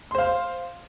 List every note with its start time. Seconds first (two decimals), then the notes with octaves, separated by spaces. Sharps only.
0.11 C6
0.15 C5
0.18 F5